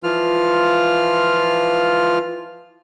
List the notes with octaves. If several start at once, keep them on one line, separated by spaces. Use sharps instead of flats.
E3 F3 F4 F6